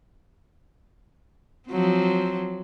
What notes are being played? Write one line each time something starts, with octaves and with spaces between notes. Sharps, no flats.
F3 F#3 C4